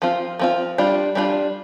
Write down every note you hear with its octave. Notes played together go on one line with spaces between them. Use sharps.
F3 C4 F4
F3 C4 F4
G3 D4 F4
G3 D4 F4